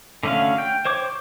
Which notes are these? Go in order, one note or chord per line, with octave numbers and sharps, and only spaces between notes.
D3 A3 C#4 F#4 F5
G5
C5 C#5 D6